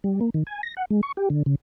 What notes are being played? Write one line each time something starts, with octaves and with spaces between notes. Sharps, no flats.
G3
A#3
D#3
G#5
A#6
F#5
G#3
C#6
G4
D3
C#3